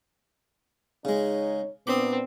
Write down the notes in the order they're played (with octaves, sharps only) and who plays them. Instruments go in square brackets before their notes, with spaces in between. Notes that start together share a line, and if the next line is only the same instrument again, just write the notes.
[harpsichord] C#3 G#3 [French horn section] D#4 C#5
[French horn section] A#2 D4 [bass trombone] B3 [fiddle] C4 [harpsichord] D6 D#6